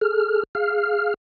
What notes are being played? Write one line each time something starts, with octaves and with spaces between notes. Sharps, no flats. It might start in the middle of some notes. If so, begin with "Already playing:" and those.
G#4 A4 F6
G#4 F5 F6